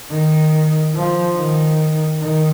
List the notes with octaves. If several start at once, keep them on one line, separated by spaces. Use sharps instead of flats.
D#3
F3
D#3
D#3